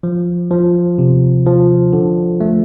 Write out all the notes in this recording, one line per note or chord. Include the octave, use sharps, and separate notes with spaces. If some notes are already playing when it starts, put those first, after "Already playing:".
F3
F3
C3
F3
D3
A3